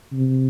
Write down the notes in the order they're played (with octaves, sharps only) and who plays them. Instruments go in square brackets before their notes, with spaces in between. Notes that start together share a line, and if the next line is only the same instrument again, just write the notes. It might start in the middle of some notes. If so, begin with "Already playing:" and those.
[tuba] C3